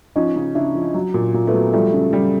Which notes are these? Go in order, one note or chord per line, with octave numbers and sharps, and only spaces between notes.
F3 C#4 D#4
C#3
C#3 D4 E4
F3
F#3
A#2
A#2
A3 B3
F#3
F3 G3 A3
C#3
C#3 G3